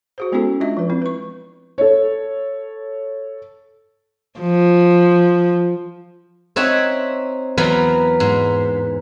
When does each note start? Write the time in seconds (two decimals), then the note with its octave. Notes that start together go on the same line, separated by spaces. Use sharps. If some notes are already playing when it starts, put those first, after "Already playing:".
0.18 F#4 G#4 C5
0.32 G#3 B3 C#4 E4 F#4 A4
0.60 G#3 D4 F4 D#5 E5
0.77 F3 B4
0.90 C4 E4
1.02 B4 C#6
1.78 A4 C#5
4.40 F3
6.56 C4 D#4 C#5 E5 F#5
7.58 E2 F#3 B3 A#4 B5 C6
8.20 G#2